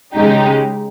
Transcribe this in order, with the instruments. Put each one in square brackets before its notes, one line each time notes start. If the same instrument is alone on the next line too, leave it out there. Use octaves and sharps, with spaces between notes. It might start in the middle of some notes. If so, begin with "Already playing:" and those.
[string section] C#3 G#3 D#4 G4